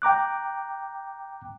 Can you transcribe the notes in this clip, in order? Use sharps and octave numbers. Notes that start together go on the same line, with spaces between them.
G5 A#5 D6 F#6